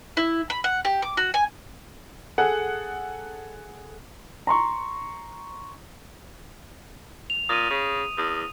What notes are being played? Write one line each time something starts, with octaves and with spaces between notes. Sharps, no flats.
E4
B5
F#5
G4
D6
F#4
G#5
G#4 A4 F#5
A#5 C6 C#6
F7
A#2 D#6 D#7
C#3
E2